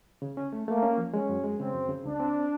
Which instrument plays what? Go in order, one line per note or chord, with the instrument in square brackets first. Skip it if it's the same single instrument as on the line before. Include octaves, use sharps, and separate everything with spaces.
[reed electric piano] C#3
C#4
A3
[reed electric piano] A3 [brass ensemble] A#3
[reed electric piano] C#4
F3
[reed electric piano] G#3 [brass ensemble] C#4
[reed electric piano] F#2
G#3
[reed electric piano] C#3 [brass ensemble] C4
[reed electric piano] F#2
C#3
[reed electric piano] C#2 [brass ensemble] D4
[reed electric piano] C4